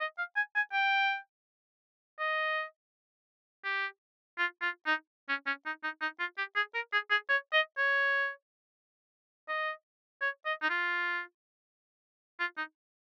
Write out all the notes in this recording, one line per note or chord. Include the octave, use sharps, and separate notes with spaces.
D#5
F5
G#5
G#5
G5
D#5
G4
F4
F4
D#4
C#4
C#4
D#4
D#4
D#4
F4
G4
G#4
A#4
G#4
G#4
C#5
D#5
C#5
D#5
C#5
D#5
D#4
F4
F4
D#4